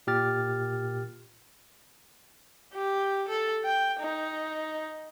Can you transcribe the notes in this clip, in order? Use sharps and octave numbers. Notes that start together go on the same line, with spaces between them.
A#2 G4 F6 A6
G4
A4
G5
D#4